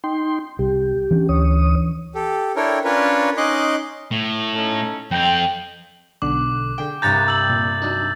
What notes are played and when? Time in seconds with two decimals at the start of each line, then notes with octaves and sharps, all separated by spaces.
0.04 D#4 G5 C6
0.59 C2 G4
1.11 E3 C#4 D4
1.29 D2 C#5 D#6
2.15 G4 A4
2.56 D4 E4 A4 A#4 C#5 G5
2.84 C#4 D4 F4 A#4 B4 C#5
3.37 C#4 D#4 D#5 C6 D6 F#6
4.11 A2
4.55 C#4 D#4 A4
5.11 F2 C4 G5
6.22 B1 D3 D6 F#6
6.78 D3 G#4 G5
7.02 C2 G2 G#4 C5 F#5 A#5 G6 A6
7.28 G4 E6 A6 F#7
7.50 A#2
7.82 F#3 D4 D#4